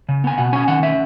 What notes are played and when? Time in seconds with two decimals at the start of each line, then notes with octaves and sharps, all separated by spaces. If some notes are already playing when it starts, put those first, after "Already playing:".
0.09 C#3
0.24 B3 G#5
0.38 B2 F#5
0.53 C#4 G#5
0.68 D#3 F#5
0.83 C#4 E5